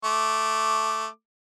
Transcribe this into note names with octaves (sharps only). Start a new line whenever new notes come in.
A3 D6